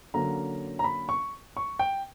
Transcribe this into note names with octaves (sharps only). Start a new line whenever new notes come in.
D3 F#3 A#3 C#4 A#5
A#5
B5
C#6
C#6
G5